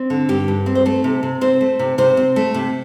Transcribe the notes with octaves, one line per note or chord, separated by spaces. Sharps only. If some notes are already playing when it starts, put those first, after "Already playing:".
Already playing: C4
D3
G2 G4
G2
C4
C5
A3 A4
C3
C3
C4 C5
A3
C3
C3 C5
C4
A3
C3